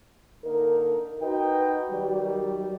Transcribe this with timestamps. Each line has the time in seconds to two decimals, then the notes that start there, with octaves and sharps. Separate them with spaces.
0.44 D3 A#3 D#4 A4 A#4
1.22 D#4 F#4 B4 G5
1.90 D#3 F#3 G3